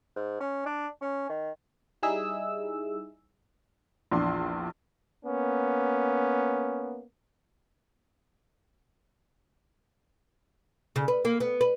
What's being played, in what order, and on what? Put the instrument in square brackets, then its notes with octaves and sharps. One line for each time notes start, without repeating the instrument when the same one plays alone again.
[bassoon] G#2
C#4
D4
C#4
D#3
[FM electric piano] G3 D#4 E4 G#4 E5 E6
[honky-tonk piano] A#1 E2 D4 C6
[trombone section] A#3 B3 C#4
[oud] C#3
B4
A#3
B3
B4